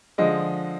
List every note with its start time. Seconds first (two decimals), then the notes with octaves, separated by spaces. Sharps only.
0.18 D3 F3 G#3 D#5